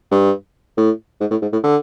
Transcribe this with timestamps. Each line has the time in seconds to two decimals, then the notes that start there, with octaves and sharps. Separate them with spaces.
0.11 G2
0.77 A2
1.20 G#2
1.31 A2
1.42 G#2
1.53 A2
1.63 D3